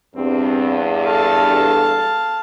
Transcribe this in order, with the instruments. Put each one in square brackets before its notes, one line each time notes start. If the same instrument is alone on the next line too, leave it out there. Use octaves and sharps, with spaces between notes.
[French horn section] E2 G2 [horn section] C4
[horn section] A4 [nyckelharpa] F5 A5